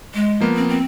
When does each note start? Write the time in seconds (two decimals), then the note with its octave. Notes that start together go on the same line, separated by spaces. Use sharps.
0.14 G#3
0.40 F3 A#3 B3
0.56 C4
0.69 C4